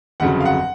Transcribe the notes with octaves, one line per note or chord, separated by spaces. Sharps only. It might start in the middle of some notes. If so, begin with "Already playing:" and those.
G1 F2 C#3 F#3 F#5
F5
F#5